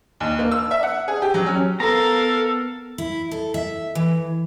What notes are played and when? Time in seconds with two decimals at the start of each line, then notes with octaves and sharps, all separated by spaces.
0.20 D#2
0.39 A#3
0.52 E6
0.71 E5
0.83 F#5
1.08 G#4
1.22 G4
1.34 F#3
1.46 C#4
1.80 B3 A4 A#4 F5 A#5
2.98 E4
3.31 A4
3.54 E5
3.95 E3